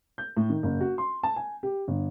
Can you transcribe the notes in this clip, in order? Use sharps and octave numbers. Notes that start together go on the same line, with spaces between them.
G6
A2
D#3
F#1
F#4
C6
A5
G#5
G4
G1